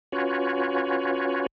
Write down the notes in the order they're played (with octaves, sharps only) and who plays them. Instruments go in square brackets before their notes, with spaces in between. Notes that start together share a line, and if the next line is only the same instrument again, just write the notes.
[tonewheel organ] C#4 F4 F#4 B4 C#5